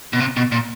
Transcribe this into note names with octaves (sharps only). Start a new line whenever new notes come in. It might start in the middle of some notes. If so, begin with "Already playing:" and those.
B2
C3
B2
A#2